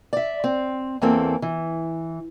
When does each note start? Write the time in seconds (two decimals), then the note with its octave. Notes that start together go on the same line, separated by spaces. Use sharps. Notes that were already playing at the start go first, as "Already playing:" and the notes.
0.13 D5 E5
0.44 C4
1.02 E2 E3 A#3 C4 A4
1.42 E3